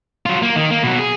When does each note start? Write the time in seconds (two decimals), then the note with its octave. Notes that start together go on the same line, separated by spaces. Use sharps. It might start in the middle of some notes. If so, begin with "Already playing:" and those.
0.26 F#3 F4
0.42 A#3
0.56 D#3
0.71 A#3
0.83 B2 F#3
0.99 G#4